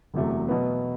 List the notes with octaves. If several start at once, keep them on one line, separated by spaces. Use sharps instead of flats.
E1 E2 C3 F#3 A3
B2 F#3 B3